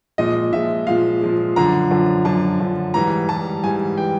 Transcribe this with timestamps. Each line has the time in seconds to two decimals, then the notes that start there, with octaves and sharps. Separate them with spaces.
0.18 A#2 F3 G#3 D#5
0.52 A#2 F3 G#3 E5
0.87 A#2 F3 G#3 F5
1.21 A#2 F3 G#3
1.56 F#2 D3 F3 A#5
1.91 F#2 D3 F3
2.25 F#2 D3 F3 A5
2.60 F#2 D3 F3
2.94 G#2 E3 G3 A#5
3.29 G#2 E3 G3 A5
3.63 G#2 E3 G3 G#5
3.97 E3 G3 G5